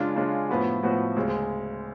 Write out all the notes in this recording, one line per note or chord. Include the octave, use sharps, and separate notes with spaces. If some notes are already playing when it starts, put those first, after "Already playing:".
Already playing: C#3 G#3 D4 F4
C#3 G#3 D4 F4
A2 F3 B3 F#4
A2 F3 B3 F#4
D2 C#3 G#3